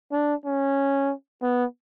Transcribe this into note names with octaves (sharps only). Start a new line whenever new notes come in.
D4
C#4
B3